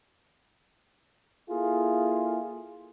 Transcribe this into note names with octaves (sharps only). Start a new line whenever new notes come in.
A#3 E4 F4 G#4 A4